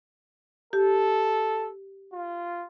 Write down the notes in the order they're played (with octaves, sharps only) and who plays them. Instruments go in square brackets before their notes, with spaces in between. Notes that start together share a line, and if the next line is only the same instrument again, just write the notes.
[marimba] G4 [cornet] A4
[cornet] F4